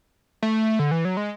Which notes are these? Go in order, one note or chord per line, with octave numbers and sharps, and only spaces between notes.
A3
D3
E3
F#3
G#3